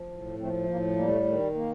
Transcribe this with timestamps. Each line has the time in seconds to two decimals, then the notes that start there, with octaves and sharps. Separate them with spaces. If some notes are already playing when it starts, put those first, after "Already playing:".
Already playing: F3
0.10 A2
0.39 F3 A3 C4
0.63 A3
0.68 A2 A#3
0.96 G3 A#3
1.07 A3
1.25 D#3 A3
1.54 A#3